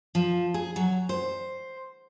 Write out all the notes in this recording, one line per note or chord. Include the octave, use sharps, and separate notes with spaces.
F3
G#4
F#3
C5